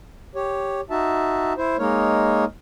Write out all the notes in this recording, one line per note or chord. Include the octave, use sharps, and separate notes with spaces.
G4 C#5
D#4 F#4 E5 A5
E4 C5
G#3 A#3 D#4 A#4 C#5